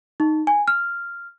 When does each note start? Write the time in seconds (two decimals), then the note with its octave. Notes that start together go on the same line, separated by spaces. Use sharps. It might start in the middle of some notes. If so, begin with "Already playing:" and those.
0.20 D#4
0.47 G#5
0.68 F6